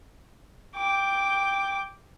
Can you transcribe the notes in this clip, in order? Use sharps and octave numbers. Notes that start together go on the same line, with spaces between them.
G5 D6